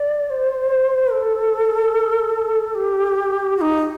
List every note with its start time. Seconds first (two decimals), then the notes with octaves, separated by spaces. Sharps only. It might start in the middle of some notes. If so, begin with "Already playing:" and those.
Already playing: D5
0.30 C5
1.12 A4
2.75 G4
3.57 F#4
3.61 D#4